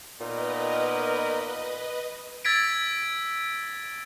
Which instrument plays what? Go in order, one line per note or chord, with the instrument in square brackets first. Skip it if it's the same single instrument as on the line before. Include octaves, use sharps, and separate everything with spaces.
[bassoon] A#2 [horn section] B3 D#4 A#4 [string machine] B4 D#5
[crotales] E6 G#6 A6 B6 D7